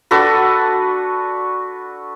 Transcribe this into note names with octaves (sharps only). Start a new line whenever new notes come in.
D4 F#4 A4 B4